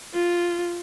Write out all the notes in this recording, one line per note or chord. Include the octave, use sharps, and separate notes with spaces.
F4